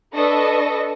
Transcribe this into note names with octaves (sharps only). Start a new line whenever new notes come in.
D4 A4 B4 D#5 C#6 A#6